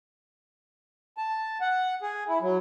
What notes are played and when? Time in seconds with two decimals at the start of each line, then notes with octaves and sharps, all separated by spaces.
1.17 A5
1.61 F#5
2.02 G#4
2.28 E4
2.42 F#3